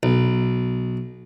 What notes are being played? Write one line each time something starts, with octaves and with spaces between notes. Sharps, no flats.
B1